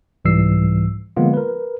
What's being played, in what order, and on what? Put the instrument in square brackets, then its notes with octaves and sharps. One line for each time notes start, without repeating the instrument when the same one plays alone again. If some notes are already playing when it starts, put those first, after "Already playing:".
[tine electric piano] C2 G#2 E3 G3 E6 C7
D3 F3 G#3 A#3 B3 F4
A#4 B4